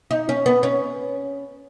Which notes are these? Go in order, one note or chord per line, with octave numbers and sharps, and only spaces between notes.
D#4
C#4
B3
C#4